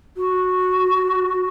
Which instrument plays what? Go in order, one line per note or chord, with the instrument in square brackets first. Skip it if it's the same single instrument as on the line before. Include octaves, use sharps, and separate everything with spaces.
[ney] F#4